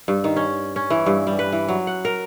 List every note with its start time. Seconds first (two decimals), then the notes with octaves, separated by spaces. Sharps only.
0.08 G2
0.24 D#3
0.36 C#4
0.76 C#4
0.90 E3
1.06 G2
1.27 G3
1.39 B4
1.52 E3
1.68 F#3
1.87 F#5
2.05 A#4